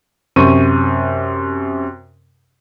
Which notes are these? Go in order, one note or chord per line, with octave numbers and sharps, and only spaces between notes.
F#2 C3 C5 C#6 D#7